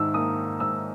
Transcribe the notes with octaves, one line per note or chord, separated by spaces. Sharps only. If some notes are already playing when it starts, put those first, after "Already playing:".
Already playing: G#2 D#3 E6
A#3 D#6
G#2 E6